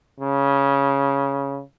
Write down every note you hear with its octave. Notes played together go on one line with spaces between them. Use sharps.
C#3